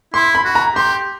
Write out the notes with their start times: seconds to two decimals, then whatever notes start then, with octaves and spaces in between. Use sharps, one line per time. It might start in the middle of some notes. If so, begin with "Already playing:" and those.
0.14 E4 C6
0.35 B5
0.45 F#4
0.55 A#5
0.75 G4 C6